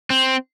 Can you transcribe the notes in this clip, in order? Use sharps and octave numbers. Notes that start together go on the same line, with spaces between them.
C4